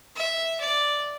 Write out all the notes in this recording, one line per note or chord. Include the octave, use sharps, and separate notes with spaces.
E5
D5